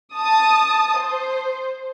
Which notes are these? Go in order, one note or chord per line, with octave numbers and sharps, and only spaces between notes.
A5 D#6
C5